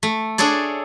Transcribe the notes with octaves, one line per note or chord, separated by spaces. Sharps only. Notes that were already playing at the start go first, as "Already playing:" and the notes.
A3
D4 G#4 A4 C#5 D5